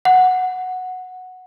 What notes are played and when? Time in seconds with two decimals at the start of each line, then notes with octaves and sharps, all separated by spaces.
0.05 F#5